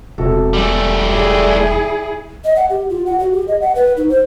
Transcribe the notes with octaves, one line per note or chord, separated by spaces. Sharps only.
E1 C3 F#4 A4
G3 A3 D5 G#5
E4 G4 G#4 D5
D#5
F#5
G4
F4
F#5
F#4
G4
D#5
F#5
B4
D#4
C5